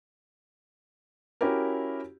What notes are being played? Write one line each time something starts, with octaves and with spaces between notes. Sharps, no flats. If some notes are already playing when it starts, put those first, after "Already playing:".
C#4 E4 F#4 G4 A#4